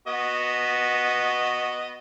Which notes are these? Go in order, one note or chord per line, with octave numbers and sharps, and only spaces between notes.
B3 F#4 D#5